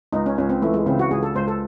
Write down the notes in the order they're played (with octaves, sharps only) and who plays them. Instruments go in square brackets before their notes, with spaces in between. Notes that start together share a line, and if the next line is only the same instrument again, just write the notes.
[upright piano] C#2 [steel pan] D#4
[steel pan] C#4
[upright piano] C#2 [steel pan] C#4
[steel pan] C4
[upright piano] E3 [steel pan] A3
[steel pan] G#3
[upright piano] C#3 [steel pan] C4
[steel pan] F#4
[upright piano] C#2 [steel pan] G#4
[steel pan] A4
[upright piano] C#2 [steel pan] C5
[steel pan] A4